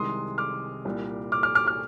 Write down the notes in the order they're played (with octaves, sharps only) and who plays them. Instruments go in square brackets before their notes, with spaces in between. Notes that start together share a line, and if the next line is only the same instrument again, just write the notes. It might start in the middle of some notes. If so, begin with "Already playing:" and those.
Already playing: [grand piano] C2 C3 D#3 G#3 C6 D#6
D6 F6
C2 A#2 G3
D6 F6
D6 F6
D6 F6
D6 F6